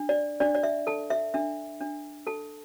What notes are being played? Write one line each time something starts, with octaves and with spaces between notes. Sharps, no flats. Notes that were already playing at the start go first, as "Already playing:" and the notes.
Already playing: D4
D5
D4 D5
D5
E5
A4 A5
E5
D4 E5
D4
A4 A5